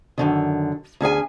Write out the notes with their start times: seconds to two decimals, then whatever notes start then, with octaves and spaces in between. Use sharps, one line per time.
0.18 F#2 D3 D#3
1.01 D2 C#4 G#4 G#5